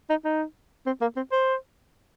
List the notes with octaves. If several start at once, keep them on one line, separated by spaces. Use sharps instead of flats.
D#4
D#4
C4
A#3
C4
C5